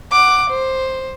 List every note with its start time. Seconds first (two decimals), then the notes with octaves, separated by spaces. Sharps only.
0.11 F#5 D6
0.49 C5